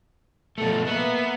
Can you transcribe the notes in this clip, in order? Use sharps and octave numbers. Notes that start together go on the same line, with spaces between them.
B2 F3 A3 A4
A#3 B3 E5